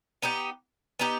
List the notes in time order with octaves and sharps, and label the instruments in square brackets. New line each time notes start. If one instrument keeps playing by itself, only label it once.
[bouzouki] B3 D#4 G4
B3 D#4 G4